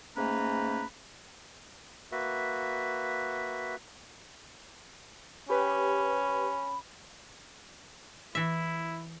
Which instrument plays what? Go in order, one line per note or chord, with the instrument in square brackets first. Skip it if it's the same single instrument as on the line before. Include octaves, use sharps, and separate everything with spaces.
[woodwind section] G#2 A3 A#3 C#4 B4 A#5
[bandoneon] A#3 F#4 B4 E5
[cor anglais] C#4 [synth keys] G4 B4 [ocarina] B5
[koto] E3 E5 [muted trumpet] E4